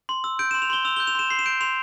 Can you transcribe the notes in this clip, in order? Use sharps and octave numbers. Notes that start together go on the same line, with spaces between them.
C6
E6
G6 D7
E7
C6
F7
C6 G7
E6 F7
G7
G6
F7
C6 E7
C6 C7
E7
G6 D7
C6 F7